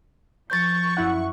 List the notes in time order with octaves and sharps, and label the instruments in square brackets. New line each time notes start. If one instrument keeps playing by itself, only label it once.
[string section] F3 C#6 [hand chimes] G6 A6
[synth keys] F#2 E4 F#5